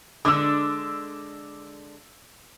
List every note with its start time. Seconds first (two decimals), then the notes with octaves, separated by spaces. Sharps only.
0.25 D3 G#3 D4 D6 E6